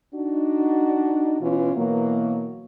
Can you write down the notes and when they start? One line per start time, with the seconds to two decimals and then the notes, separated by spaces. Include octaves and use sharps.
0.14 D4 D#4 F#4
1.40 B2 E3 C#4 F4
1.76 B2 E3 F#3 A#3